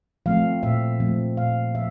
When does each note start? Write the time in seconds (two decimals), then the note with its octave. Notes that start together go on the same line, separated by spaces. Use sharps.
0.26 F3 A3 C4 F5
0.63 A#2 E5
1.00 F3 A3 C4
1.37 A#2 F5
1.75 F3 E5